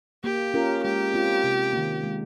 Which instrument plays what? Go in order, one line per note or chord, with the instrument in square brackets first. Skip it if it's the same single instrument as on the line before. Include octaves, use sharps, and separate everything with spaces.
[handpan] A#3 [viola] G4
[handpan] C#4 F4 A#4
[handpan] G#3 [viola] G4
[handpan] C4 F4
C3
D#3 A#3
G#3